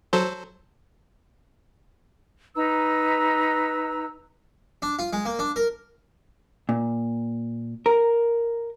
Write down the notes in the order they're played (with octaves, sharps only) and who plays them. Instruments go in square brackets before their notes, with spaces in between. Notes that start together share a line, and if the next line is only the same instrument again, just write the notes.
[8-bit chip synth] F#3 A4 C5
[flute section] D#4 B4 A#5 E6
[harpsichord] D4
F4
G#3
A#3
D4
A#4
[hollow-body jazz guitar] A#2
A#4